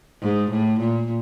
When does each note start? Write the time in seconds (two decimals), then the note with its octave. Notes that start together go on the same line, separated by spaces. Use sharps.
0.22 G#2
0.51 A2
0.80 A#2